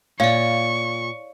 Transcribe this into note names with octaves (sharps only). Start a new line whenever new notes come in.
A#2 C#5 D5 F5 C#6